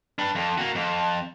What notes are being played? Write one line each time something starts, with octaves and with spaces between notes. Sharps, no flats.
D4 B4
F2
A#3 F#4
F2